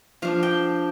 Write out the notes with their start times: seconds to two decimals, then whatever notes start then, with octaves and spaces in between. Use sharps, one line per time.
0.22 F3 D4 F5
0.43 G5